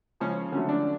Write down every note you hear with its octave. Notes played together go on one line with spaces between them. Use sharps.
C#3 F3 G#3 C#4
D3 F#3 A3 C#4
D4